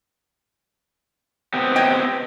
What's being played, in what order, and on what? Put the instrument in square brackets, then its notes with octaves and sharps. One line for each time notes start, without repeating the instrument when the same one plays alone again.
[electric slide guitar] B3 C4 G4
[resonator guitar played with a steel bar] C#5 D#5 G5